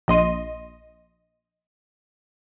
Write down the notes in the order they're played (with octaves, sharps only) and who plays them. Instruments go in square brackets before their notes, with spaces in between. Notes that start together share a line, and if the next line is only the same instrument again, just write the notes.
[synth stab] A#1 D#5 C6 D#7